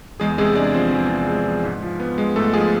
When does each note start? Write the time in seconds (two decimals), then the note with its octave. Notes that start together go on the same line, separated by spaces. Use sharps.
0.20 E2 G#3 G#4
0.38 C3 G#3 G#4
0.56 G#3 D4 D5
0.74 F3 C4 C5
0.92 E2
1.10 C3
1.29 G#3
1.46 F3
1.63 G#2
1.82 F3
2.00 B3
2.18 G#3
2.36 G#2 A3 A4
2.53 F3 G#3 G#4